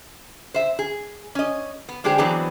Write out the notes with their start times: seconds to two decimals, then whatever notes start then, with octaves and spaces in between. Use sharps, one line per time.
0.54 C5 E5
0.79 G#4
1.35 C#4 D#5
1.89 B3
2.04 D3 G#3 D4 G4 G#4 C5
2.18 E3 F#3 B3 C4 D4 G#4